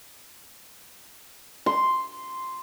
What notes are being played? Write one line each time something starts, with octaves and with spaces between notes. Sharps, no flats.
C6